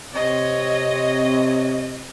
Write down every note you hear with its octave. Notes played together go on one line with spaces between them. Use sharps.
C3 C4 C#5 D#5